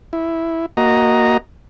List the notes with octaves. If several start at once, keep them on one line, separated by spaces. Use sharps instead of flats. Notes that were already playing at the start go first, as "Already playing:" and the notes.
E4
A#3 F#4 D#5 A#5